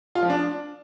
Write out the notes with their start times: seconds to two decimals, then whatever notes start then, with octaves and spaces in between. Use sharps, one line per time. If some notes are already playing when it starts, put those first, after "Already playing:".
0.15 F4
0.23 F3
0.30 D4